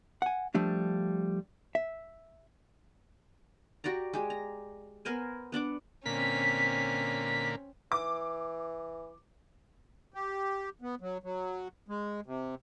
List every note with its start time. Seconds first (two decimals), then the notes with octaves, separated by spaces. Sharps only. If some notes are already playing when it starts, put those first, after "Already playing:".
0.22 F#5 G#5
0.54 F3 G3 A3 D4
1.75 E5
3.84 F#4 G4 D5 A#5
4.13 G#3 G4
4.30 A#5
5.05 B3 A#4 C5 G#5
5.52 B3 D4 F#5 D6
6.05 A#2 D3 A#3 C4 C#4 B6
7.92 E3 D6
10.14 G4
10.82 B3
11.01 F#3
11.23 F#3
11.89 G#3
12.26 C3